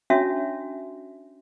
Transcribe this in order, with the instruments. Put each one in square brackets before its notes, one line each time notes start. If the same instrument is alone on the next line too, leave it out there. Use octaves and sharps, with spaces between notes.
[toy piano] C#4 D4 F#4 C#5 E5